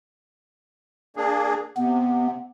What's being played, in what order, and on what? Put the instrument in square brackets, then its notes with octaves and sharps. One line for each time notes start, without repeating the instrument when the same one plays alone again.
[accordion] A#3 D4 G#4
[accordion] C3 [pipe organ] B3